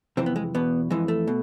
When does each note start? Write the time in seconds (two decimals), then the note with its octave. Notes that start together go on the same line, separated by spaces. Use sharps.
0.17 F2 C3 E3 C4
0.26 B3
0.36 G#3
0.55 E2 B2 B3
0.90 F2 E3 G#3
1.08 A3
1.27 B2